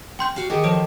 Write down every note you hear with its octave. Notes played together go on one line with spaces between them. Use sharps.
C#4 G5 C6 G6
F#4 G4 F5
D#3 G4 G#4 F#5
F3 F#4 A4 C5 C#5 D7